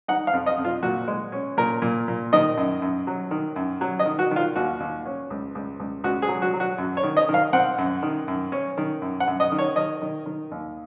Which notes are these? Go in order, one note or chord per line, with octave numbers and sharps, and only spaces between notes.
D#4 F#5
F5
F2
D#5
F2
F4
A#2 F#4
G#3
C#4
A#2 A#4
A#2
A#2
D#3 D#5
F#2
F#2
F#3
D#3
F#2
F#3
D#5
D#3
F#4
D#3
F4
D#2 F#4
D#2
C#4
C#2
C#2
C#2
C#2 F#4
G#4
F#3
F#4
F#3
F#4
F#2
C#5
D#3
D#5
D#3
F5
C4 F#5
F#2
D#3
F#2
C#4
D#3
F#2
F#5
F#2
D#5
D#3
C#5
D#3 D#5
D#3
D#3
D#2